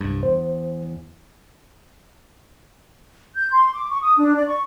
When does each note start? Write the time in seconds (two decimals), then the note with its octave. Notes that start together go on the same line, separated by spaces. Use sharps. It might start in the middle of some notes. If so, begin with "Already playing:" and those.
0.01 C2 G2
0.23 E2 C5
3.35 G6
3.51 C6
3.73 D6
3.90 C#6
4.02 D#6
4.17 D4
4.36 D5
4.48 C#6